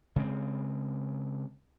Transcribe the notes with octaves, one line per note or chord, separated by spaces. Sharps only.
C#3 G#3 C4